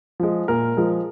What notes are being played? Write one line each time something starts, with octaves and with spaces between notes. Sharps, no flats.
F3 G#3
A#2 A#4
F3 G#3